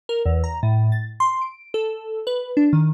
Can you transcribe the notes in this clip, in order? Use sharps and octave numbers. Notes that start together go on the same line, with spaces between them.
A#4
E2
A#5
A2
A6
C6
D7
A4
B4
D4
D#3